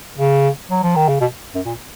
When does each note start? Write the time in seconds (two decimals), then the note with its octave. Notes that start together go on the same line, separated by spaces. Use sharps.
0.18 C#3
0.70 F#3
0.83 F3
0.95 D#3
1.08 C#3
1.21 B2
1.55 F#2
1.66 A#2